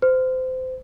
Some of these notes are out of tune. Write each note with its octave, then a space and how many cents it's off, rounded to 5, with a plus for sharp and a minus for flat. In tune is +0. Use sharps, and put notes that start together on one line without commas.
C5 -25